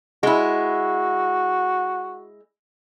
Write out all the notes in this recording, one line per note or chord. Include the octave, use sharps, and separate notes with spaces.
G#3 E4 F#4